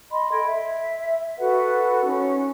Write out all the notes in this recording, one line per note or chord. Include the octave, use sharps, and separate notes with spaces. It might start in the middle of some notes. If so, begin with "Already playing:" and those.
D#5 B5 C6
A4 G5 G#6
E5
F#4 A4 B4 F#5
C#4 D#4